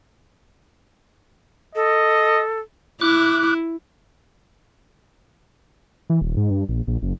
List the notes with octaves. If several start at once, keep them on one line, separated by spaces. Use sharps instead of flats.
A4 D#5
E4 D6 F#6
E3
D#1
G#2
G2
A#1
A#1
F#1